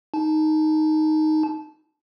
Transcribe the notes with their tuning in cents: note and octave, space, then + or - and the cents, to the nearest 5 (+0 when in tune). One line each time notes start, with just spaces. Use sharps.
D#4 +0 A5 -20